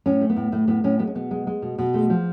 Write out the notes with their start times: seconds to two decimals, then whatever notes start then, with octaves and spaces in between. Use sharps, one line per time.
0.06 A2 C#4
0.21 A3
0.30 B3
0.36 A2
0.52 A2 A3
0.68 A2 B3
0.84 A2 C#4
0.99 G#3 B3
1.07 C#4
1.15 B2 B3
1.31 G#3
1.47 G#3
1.62 B2
1.78 B2
1.94 G#3 A3
2.10 F3 B3